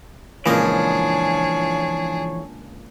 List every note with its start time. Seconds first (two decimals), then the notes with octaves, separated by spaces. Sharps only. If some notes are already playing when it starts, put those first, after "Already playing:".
0.46 C#2 A#2 E3 F3 D4 G#4 C#5 D#5